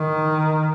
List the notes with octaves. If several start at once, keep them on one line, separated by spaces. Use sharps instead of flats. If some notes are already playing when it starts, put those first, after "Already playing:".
Already playing: D#3